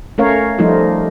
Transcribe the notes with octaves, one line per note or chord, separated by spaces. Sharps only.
A3 C#4 A#4 C#5 F5
F3 G3 A3 D#4 F4